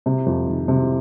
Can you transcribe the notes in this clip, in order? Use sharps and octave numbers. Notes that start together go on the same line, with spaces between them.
C3
F2
D#3
C3